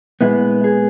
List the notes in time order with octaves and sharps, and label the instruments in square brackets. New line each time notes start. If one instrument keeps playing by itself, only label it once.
[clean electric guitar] A#2 G#3 B3 E4
G#4